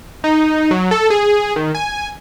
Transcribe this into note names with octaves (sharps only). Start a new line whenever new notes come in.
D#4
F#3
A4
G#4
D#3
G#5